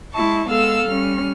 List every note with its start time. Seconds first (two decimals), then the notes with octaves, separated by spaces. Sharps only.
0.12 G#3 E4 A5 C#6
0.49 G#3 B3 A4 F5 E6
0.87 G3 C#4 F6